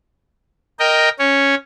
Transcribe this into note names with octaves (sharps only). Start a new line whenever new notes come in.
A#4 D#5 G5
C#4 C#5